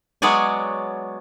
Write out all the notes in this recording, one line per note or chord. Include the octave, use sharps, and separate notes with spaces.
F#3 G#3 B3 C#5 D5 G#5